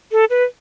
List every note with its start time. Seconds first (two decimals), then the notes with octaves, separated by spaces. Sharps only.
0.12 A4
0.30 B4